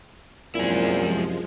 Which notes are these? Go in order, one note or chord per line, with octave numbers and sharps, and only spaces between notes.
C2 F#2 A#2 F3 G#3 E4 G#4